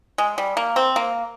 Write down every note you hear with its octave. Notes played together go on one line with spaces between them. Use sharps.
G#3
G3
A#3
C4
A#3